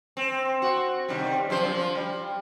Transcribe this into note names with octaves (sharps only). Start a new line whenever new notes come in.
C4
F#4
C3 D#3 G3
F#2 F3 C5
F3
G3